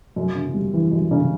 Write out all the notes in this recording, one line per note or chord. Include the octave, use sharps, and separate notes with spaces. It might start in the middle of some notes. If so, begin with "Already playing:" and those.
F#2
C#3
G3
E3
F#2
C#3